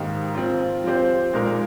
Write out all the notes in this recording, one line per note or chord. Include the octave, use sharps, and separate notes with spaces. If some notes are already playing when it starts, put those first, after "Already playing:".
Already playing: G#2 D#3 A#3 D#4 G4
F3 C4 F4
F3 C4 G4 C5
A#2 G#3 D#4 A#4